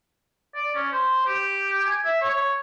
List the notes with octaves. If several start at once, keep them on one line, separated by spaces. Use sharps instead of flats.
D5
C#4
C5
G4
G#5
E5
C#5